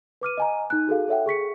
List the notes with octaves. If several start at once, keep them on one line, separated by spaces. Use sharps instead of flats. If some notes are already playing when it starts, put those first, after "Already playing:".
B4 D6 F6 D#7
D#5 G#5 A#5
D#4 F#6
F#4 G#4 A4 F5
A4 C#5 E5 F#5 G5
G#4 C#6 B6 C#7